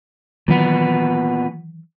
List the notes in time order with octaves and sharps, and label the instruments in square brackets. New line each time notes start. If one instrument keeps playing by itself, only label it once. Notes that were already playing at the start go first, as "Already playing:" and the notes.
[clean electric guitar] A#2 B3 [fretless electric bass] D#3 E3 F#3